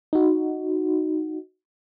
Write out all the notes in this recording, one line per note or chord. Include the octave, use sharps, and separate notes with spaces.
D#4 F#4